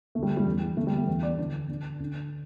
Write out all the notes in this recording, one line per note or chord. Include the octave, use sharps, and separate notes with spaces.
D2 D3 G3 A3
G3
E2 E3
D2 D3 A3
G3
A3
E2 E3 B3
D5
D2 D3 D4
D2 D3
D2 D3